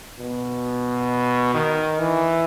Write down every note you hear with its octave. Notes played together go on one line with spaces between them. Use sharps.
B2
D#3
E3